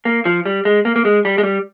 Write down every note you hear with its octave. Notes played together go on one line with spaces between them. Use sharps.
A#3
F3
G3
G#3
A#3
A#3
G#3
G3
G#3
G3